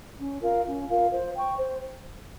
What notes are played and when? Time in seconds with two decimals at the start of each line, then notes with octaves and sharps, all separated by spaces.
0.19 C#4
0.43 F4 A#4 F5
0.66 C#4
0.89 F4 A#4 F5
1.12 C5
1.35 G5 C#6
1.58 C5